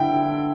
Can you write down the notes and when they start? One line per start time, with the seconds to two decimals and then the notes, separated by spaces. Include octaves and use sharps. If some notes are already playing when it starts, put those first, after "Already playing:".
Already playing: D3 E4 G5